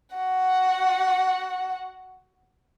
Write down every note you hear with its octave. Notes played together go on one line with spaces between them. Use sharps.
F#4 F#5